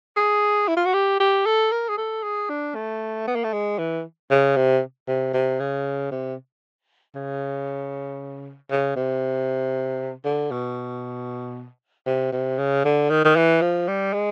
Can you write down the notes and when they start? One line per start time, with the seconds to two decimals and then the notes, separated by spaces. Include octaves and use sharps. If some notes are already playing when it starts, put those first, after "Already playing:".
0.16 G#4
0.68 E4
0.77 F4
0.85 F#4
0.94 G4
1.20 G4
1.46 A4
1.72 A#4
1.89 G#4
1.97 A4
2.23 G#4
2.50 D4
2.75 A3
3.27 B3
3.36 A#3
3.44 A3
3.53 G#3
3.78 E3
4.31 C#3
4.56 C3
5.08 C3
5.34 C3
5.60 C#3
6.11 C3
7.15 C#3
8.70 C#3
8.96 C3
10.25 D3
10.51 B2
12.07 C3
12.32 C3
12.58 C#3
12.85 D3
13.10 D#3
13.25 D#3
13.36 E3
13.61 F3
13.88 G3
14.13 G#3